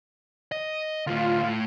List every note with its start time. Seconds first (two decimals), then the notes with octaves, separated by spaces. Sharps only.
0.52 D#5
1.07 D2 A2 F4
1.43 A2